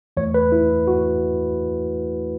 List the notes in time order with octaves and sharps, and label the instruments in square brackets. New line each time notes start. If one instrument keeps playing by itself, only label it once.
[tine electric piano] E2 E3 A3 C#5
B4
E4
F#4